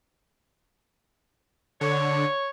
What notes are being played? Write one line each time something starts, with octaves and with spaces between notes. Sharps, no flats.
D3 C#5